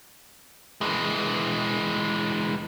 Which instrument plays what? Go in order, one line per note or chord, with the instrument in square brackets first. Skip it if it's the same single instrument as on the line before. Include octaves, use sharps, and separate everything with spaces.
[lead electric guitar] E3 G#3